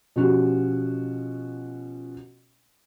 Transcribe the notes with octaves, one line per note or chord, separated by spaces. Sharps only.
B2 F3 C#4 F#4 G4